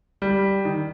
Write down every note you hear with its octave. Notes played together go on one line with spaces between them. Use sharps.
G3
D#3